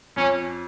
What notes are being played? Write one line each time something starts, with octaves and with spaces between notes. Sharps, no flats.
F2 C#4